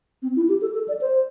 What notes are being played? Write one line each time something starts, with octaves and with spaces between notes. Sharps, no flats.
C4
E4
G4
A4
A4
D5
C5